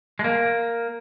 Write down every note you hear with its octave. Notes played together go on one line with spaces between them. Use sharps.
G#3
A#3